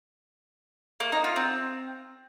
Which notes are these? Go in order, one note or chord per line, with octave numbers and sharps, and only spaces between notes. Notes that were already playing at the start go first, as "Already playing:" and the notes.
A#3
D#4
F4
C4